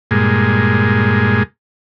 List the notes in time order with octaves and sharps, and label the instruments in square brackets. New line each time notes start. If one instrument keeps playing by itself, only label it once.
[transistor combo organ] G2 A#2 G#3